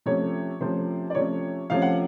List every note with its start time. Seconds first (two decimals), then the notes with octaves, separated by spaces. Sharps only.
0.06 C3 F3 A3 C#4 C#5
0.60 C3 F3 A3 C#4 C5
1.10 D5
1.15 C3 F3 A3 C#4 C#5
1.70 C3 F3 A3 C#4 F5
1.82 F#5